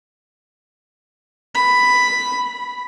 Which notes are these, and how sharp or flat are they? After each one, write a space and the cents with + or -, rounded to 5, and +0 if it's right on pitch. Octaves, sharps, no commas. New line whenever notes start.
B5 +5
B5 -15